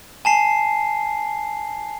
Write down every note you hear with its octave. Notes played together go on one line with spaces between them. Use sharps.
G#5 A5 C7